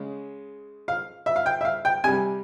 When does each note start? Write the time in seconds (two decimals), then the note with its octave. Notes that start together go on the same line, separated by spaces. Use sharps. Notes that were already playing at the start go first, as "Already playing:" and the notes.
Already playing: C#3 G#3
0.88 F5
1.26 E5
1.36 F5
1.46 G5
1.61 E5
1.65 F5
1.85 G5
2.04 C3 G3 G#5